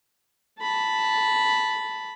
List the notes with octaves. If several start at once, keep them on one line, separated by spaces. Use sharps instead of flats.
A5 B5